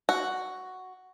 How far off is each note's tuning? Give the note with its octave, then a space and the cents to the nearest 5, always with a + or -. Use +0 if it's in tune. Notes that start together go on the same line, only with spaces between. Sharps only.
F#4 +5